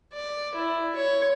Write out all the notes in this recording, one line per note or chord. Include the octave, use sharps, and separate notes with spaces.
D5
E4
C#5